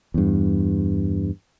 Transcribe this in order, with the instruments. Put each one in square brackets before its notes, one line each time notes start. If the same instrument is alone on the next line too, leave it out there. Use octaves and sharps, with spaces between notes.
[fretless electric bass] E2 G2